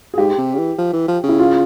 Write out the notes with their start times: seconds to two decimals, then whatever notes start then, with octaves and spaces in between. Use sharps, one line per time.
0.14 G#4
0.18 G#2 G4
0.38 C3
0.54 C#3
0.59 E3
0.78 F3
0.93 E3
1.08 F3
1.24 C#3 E4
1.39 F4